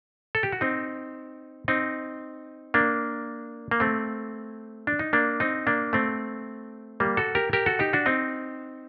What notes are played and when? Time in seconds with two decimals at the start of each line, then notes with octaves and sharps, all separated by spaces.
0.35 A4
0.43 G4
0.52 F#4
0.61 C4 D#4
1.68 C4 D#4
2.74 A#3 D4
3.71 A#3
3.80 A3 C4
4.87 D4
4.99 D#4
5.13 A#3 D4
5.40 C4 D#4
5.67 A#3 D4
5.93 A3 C4
7.00 G3 A#3
7.17 F#4 A4
7.35 G4 A#4
7.53 G4 A#4
7.66 F#4 A4
7.79 D#4 G4
7.93 D4 F#4
8.06 C4 D#4